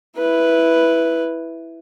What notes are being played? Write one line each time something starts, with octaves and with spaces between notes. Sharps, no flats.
E4 B4